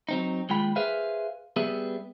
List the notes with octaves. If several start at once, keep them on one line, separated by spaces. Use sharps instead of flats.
F#3 C4 D#4
D#2 G#3 F4 G5 B5
G#4 B4 C5 E5 F5
G3 B3 G#4 B4 E5